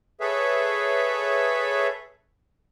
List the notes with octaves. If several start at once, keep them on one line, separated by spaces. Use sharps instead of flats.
G#4 A4 B4 C#5 E5